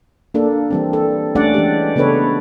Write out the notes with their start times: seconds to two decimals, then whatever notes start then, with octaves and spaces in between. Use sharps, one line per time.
0.34 A#3 D4 A4
0.71 E3 G3 C4
0.93 A4
1.35 G3 A3 C#4 D4 D5 F#5
1.54 E3 G#3 G4
1.96 C#3 B3 D4 A4 B4 C#5